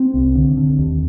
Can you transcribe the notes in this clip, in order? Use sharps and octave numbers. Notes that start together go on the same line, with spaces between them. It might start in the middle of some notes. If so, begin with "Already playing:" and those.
Already playing: C4
C2
D3
D3
D#2